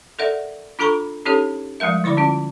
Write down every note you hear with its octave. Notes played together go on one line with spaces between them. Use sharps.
A4 A#4 D5 E5 F#5
D4 F4 A4 A#5 B5 C#6
C#4 D#4 G4 A4 C#5
F3 G3 G#3 A#4 E5
D3 E4 D5 B5 D6
C#4 F4